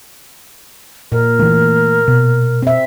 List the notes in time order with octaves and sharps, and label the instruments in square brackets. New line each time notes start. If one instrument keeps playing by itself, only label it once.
[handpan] A#2 [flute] A#4
[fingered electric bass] E3 A3 A#3
B2
[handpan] C4 E5